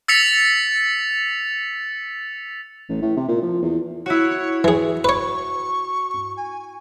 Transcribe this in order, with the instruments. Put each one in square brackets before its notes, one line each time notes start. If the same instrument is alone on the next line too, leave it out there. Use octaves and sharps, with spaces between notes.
[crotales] E6 A6 B6 C#7 F7
[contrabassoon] A1
A2
C3
A#2
F3
E2
[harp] E4 F#4 [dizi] C#5
[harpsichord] E3 G#4
[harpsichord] B4 C#5 [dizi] C#6
[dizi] G#5